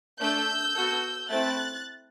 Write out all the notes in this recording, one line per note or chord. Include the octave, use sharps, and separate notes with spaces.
A3 D4 A4 E6 G6
B3 F#4 A4
A3 C4 E4 F#6 A6